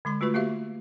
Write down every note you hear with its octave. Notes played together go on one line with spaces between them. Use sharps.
D3 G#3 C6
A3 F4 F#4 B4 C#6
A#3 F#4 G4 E5 F5